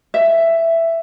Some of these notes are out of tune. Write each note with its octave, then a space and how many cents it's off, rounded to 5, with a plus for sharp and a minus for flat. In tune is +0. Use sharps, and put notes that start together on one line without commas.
E5 +10